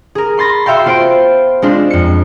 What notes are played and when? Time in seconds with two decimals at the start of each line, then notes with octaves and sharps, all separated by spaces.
0.15 G#4 A#4
0.38 B5 C6 A6 A#6
0.66 F#4 E5 F5 G5 C6
0.86 B3 F4 C5 C6 D7
1.62 G#3 C4 D4 F4
1.90 F2 C#7